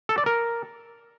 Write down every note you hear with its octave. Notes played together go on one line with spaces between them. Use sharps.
A4
D5
A#4